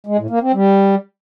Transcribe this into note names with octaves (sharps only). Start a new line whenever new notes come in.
G#3
A2
A#3
C4
G3